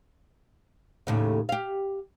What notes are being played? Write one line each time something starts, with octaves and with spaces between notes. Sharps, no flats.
D#2 A2 C#3
G4 F5